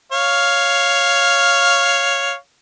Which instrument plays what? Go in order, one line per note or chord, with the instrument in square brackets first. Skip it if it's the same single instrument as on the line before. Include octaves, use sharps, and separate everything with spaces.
[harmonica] C#5 F5